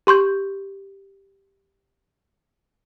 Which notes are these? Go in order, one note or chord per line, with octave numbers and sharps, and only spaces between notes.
G4 C6 C#6 G6